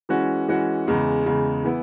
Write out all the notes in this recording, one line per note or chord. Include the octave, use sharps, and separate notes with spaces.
E3 G#3 C#4 F#4
E3 G#3 C#4 F#4
E2 C#3 G#3
E2 C#3 G#3
E3 B3 E4